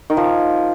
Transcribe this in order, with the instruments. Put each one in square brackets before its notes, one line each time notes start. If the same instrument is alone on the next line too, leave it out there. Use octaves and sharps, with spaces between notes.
[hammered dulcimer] D#3
F3